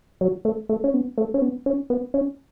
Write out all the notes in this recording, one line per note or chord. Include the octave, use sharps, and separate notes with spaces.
F#3
A3
A3
C#4
B3
A3
C#4
B3
C#4
B3
C#4